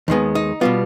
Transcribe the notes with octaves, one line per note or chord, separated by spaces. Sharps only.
D#2 D#3 G#3 B3
D#4
B2 G3 B3 F4